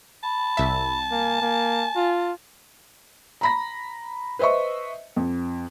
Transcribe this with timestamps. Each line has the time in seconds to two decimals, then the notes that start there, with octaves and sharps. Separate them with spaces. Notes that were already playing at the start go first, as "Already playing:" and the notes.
0.24 A5 B5
0.57 C2 E5
1.11 A#3 G#5
1.42 A#3
1.96 F4
3.41 A#5 B5 A#6
4.39 B4 C5 D#5 E5 C#6
5.16 F2